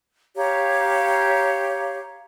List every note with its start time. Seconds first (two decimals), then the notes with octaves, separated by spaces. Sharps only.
0.36 G4 C#5 F5 A#5